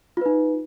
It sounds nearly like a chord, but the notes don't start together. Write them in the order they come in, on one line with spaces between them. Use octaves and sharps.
F4 B4 D#4